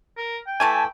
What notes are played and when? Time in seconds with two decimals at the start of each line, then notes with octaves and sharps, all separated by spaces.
0.18 A#4
0.47 G5
0.60 E3 A3 E4 G#5 A5